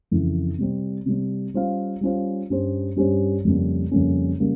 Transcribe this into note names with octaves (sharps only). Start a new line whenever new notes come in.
F2 C#3 E3
C3 G3 C4
C3 G3 C4
G3 C#4 F4 C5 F5
G3 C#4 F4 C5 F5
G2 G3 C#4 G4 C5
G2 G3 C#4 G4 C5
F2 C#3 G3 A#3 C#4
F2 C#3 G3 A#3 C#4
C#3 G3 A#3